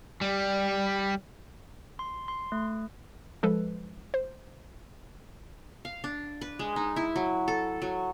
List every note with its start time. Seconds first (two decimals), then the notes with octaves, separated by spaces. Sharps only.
0.21 G3
1.99 C6
2.28 C6
2.52 A3
3.43 F3 G#3 A4 B4
4.14 C5
5.85 F5
6.04 D4
6.41 B4
6.59 G#3
6.76 D#4
6.96 E4
7.16 F#3
7.48 A4
7.82 F#3